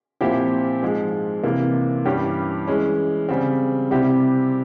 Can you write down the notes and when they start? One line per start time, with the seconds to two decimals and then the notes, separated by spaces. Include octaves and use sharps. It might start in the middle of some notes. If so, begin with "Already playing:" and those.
0.21 A#2 F3 C4 E4 G4
0.82 G#2 F3 G#3
1.43 C3 E3 A#3
2.05 G2 E3 G3 C#4 G4
2.67 E3 G#3 C#4
3.29 C#3 G3 C4
3.91 C3 G3 C4 E4 G4